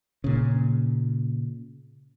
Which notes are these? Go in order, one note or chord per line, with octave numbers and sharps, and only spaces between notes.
A#2 C#3